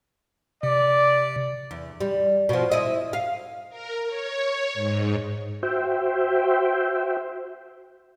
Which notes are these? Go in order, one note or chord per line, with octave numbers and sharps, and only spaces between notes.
C3 D5
E2
G3
B2 F3
E4 D#5
F5
A#4
C#5
C#5
G#2
F#4 C5 E5 G5